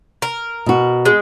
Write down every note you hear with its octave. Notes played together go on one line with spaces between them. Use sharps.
A#4
B2 F#4
G#3